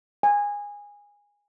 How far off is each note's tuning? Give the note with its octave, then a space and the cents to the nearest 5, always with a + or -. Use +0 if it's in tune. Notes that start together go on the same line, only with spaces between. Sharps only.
G#5 -20